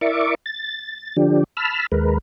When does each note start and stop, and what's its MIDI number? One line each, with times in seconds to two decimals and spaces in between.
0.01 0.35 64
0.01 0.35 70
0.01 0.35 74
0.01 0.35 76
0.01 0.35 85
0.01 0.35 86
0.46 1.17 93
1.17 1.44 50
1.17 1.44 53
1.17 1.44 62
1.17 1.44 67
1.57 1.86 81
1.57 1.86 83
1.57 1.86 88
1.57 1.86 89
1.92 2.18 39
1.92 2.18 56
1.92 2.18 70
1.92 2.18 71